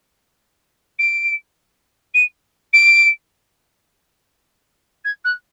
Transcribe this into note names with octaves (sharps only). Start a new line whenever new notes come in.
D7
D#7
D7
G#6
F#6